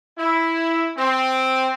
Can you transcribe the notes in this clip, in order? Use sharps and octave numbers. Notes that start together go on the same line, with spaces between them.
E4
C4